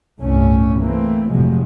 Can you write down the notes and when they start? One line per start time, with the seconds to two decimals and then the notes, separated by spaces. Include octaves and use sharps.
0.20 G1 C2 A2 A3 C#4
0.81 E3 A3 A#3 C4
1.31 F1 A2 C3 F3 F#3 G#3